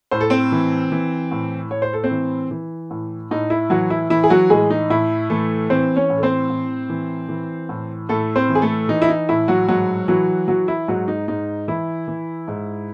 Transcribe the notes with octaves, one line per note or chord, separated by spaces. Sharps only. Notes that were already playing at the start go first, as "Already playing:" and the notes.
A2 C5
A4
C4 C5
E3
E3
A2
A2 C#5
C5
A4
C4 C5
E3
E3
A2
A2 D#4
E4
E3 F#3 F#4
E4
E3 E4
G#4
F#3 F#4
A2 G#3 G#4
D#4
A2 E4
E3 A3 A4
E3 C4 C5
C#4 C#5
A2
A4
C4 C5
A2
E3
E3
A2
A2 A3 A4
C4 C5
E3
G#4
A3 A4
E3 D#4
E4
D#4
A2 E4
F#3 F#4
G#2 F#3 F#4
E3 F#3 F#4
E3 F#3 F#4
E4
G#2 F#3 F#4
D#4
G#2 D#4
E3 E4
E3
G#2